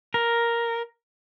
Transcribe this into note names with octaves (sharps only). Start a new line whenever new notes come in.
A#4